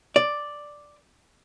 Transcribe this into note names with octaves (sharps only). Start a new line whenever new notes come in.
D5